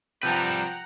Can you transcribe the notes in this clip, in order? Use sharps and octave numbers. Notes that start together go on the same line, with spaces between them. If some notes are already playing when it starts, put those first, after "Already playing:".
C3 F3 G3 B4 F#5 G5 A5 A#5